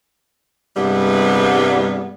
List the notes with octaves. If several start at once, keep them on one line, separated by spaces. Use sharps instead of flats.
G2 C3 G3 G#3 B3 E4